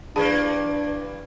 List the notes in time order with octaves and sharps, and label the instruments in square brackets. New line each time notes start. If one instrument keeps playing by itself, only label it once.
[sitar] G2 E3 A#3 [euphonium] D4 [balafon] G#4 A5 B5